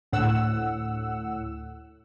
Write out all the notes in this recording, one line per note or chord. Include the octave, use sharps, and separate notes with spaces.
D2 A2 F#5 E6